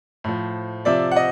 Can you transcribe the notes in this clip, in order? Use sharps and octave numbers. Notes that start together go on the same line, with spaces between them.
A2 F3
C3 F3 D5 E5
F#5
D#5